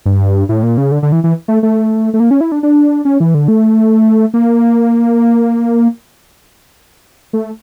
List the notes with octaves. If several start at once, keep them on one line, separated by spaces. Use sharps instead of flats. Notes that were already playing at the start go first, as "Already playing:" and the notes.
G2
A2
A#2
C#3
D3
D3
E3
E3
A3
A3
A3
A#3
C#4
E4
D4
D4
C#4
E3
D3
A3
A#3
A3